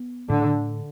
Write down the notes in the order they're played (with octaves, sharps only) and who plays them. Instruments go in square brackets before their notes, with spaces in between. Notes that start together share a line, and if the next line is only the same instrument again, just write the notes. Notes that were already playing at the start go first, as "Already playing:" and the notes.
Already playing: [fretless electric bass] B3
[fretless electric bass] A2 [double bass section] D3